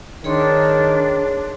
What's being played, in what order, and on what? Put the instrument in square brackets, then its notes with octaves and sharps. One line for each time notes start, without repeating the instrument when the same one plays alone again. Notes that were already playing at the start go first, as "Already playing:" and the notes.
[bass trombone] D#3 [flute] D4 [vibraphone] G#4 C#5 C6